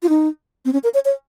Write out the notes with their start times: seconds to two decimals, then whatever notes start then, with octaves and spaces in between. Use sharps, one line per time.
0.03 F4
0.09 D#4
0.65 C4
0.73 C#4
0.84 A#4
0.94 C#5
1.05 C#5